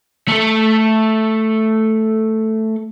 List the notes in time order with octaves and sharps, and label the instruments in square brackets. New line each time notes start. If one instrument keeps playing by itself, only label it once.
[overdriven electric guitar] A3 A4